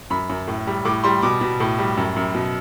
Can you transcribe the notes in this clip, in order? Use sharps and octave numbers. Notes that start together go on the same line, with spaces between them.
F#2 B5
F#2
A2
G3
A2 D6
G3 C6
B2 D6
B2
A2
G3
F#2
F#2
B2